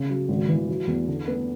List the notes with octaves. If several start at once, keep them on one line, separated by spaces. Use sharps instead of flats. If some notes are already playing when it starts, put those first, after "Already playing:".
Already playing: C#3
F#3
G#1
E3
F#3
E2
D3
B3